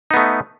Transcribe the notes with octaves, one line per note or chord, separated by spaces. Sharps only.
A3 B3 D#4